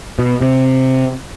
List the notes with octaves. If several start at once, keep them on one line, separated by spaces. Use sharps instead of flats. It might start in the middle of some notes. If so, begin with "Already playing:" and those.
B2
C3